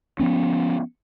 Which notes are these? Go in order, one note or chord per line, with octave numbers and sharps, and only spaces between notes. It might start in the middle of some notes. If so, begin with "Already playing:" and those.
F3 B3 C#4